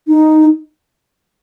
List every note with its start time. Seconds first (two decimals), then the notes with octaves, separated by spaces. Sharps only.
0.08 D#4